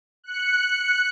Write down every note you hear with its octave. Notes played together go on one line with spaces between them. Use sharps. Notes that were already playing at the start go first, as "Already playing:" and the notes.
F#6 C#7